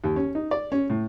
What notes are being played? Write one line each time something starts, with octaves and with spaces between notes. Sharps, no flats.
D#2
C#4
D#4
D5
C#4
A2